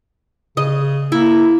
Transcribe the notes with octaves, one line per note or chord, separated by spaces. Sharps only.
C#3 D#5
A#3 E4